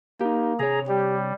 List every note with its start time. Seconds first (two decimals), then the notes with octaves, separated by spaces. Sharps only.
0.21 A#3 D#4 G4
0.59 C3 G#4 C#5 A#5
0.89 G3 G4